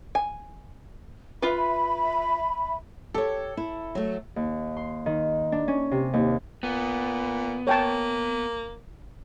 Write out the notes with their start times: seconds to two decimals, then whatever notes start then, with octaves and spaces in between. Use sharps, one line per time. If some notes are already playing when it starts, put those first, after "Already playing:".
0.15 G#5
1.42 F4 B4 E5 B5
3.14 G4 A4 C#5
3.57 E4
3.95 F#3 A3
4.36 D#2
4.77 C6
5.06 D#3
5.52 D4
5.68 C#4
5.91 C3
6.13 D#2
6.63 A#2 B3
7.67 A#3 C#5 G5 A5